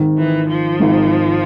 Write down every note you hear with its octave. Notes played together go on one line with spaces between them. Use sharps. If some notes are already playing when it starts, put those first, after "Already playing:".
Already playing: G#1 G#2 D#3
E3
F3
G#1 G#2 D#3